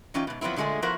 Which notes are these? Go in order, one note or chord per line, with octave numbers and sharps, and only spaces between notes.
E3 C#4 D#4 F4 G5
G#2 B2
F3 F#3 B3 C4 E4
A#2 D3 G#3 A3 G#4
F3 B3 E4 F#4 A#4 C5